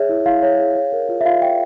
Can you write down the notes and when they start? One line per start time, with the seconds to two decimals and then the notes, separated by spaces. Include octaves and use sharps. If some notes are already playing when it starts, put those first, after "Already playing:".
Already playing: G#4 C#5 E5
0.09 E4
0.26 E4 F5
0.43 C#5
0.59 G#4
0.75 C#5
0.92 A#4
1.09 F4
1.21 E5
1.25 F4 F5
1.42 C#5 E5 G5